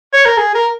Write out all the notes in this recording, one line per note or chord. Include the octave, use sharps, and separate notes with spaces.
C#5
A#4
G#4
A#4